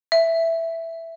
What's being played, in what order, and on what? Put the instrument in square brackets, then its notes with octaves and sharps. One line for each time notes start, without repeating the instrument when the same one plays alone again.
[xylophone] E5